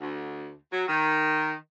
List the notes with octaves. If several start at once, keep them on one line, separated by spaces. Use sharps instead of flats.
D2
F#3
D#3